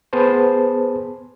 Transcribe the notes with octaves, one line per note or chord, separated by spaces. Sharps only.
B3 G#4 B4 C5 A5